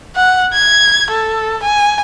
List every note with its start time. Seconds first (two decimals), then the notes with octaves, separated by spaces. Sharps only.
0.15 F#5
0.54 G#6
1.11 A4
1.63 G#5